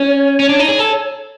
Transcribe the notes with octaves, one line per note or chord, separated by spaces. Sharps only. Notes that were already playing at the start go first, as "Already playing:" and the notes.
Already playing: C#4 C#5
C#4
D4
D#4
G#4
A4